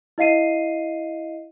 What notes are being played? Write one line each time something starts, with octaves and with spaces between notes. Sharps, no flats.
E4 D#5 F5 C7 D#7